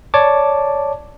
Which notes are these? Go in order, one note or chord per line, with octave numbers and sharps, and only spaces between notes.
C#5 D5 A5 D6